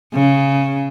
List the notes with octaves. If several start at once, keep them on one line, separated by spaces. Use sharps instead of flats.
C#3